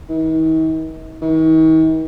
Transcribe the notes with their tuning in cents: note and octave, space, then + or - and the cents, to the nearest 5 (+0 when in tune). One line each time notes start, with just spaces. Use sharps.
D#3 +45
D#3 +45